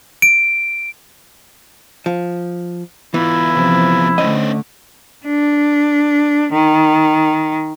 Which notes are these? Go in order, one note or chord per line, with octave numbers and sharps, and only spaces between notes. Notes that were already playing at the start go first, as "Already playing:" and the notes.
D7
F3
E3 B3 E4 F4
C3 F3
D3 A3 C#4 C5 D#5
D4
D#3